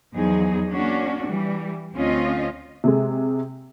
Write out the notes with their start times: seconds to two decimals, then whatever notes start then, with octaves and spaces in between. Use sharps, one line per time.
0.14 E2 F3 F#3 D#4 G#4
0.71 A#3 C#4 D4 F#4
1.28 E3 G3
1.94 D2 C4 C#4 F4 D#5
2.84 C3 G#3